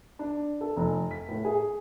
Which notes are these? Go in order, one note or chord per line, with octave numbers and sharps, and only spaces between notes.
D4
A4
F1
B6
A2
G#4